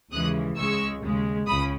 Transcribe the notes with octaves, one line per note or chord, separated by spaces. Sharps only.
D#2 C#3 E3 G#3 D#6 F#6
C#2 C#3 G#3 C#6 E6
D#2 C#3 G#3
C#2 C#3 B5 D#6